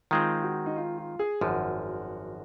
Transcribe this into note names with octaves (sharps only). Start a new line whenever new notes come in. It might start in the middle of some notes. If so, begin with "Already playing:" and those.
D#3 G#3 C4 F4
F#4
D#4
F4
F4
G#4
G#1 F#2 F3 F#4